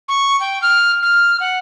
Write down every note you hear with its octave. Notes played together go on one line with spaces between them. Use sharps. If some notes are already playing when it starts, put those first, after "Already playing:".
C#6
G5
F6
F6
F#5